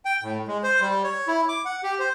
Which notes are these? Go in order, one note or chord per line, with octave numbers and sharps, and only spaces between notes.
G5
A2
G#3
C5
G3
C#5
E4
D6
F#5
G4
C5